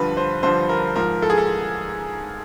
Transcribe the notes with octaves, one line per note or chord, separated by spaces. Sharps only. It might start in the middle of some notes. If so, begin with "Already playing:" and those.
Already playing: G2 D3 F3 B4
C5
G2 D3 F3 C5
A#4
G#2 F3 A#4
A4
G#4
A4